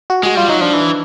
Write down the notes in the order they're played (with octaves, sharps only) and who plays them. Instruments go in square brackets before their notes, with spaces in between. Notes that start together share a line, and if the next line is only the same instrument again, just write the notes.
[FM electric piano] F#4
[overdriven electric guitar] G#3 [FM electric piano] F#4
[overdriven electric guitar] G3 [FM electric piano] F4
[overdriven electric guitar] F#3 [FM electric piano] D#4
[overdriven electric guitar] F3 [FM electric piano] D4
[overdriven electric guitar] E3